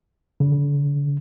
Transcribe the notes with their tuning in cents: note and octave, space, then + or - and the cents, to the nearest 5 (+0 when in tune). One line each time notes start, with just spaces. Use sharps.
D3 -40